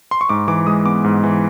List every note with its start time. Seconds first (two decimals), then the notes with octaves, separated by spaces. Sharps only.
0.11 C6
0.21 C#6
0.29 G#2 D6
0.48 E3 D6
0.67 G#3 D#6
0.85 B3 D6
1.04 G#2
1.24 E3